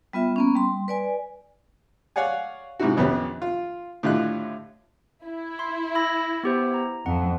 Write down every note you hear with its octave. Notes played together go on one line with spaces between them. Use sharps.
G3 B3 F4 E5
A#3 B3 C#4
G3 C6
B4 D5 G#5
C#5 D5 F5 F#5 G#5
G#2 C3 D#4 E4 F#4
A#1 F2 B3 C#4 G4
F4
A2 D3 F4 G4 D#5 F#6
E4
C6
B5 E6 A#6
B3 G4 C5
A#5
F2 F#5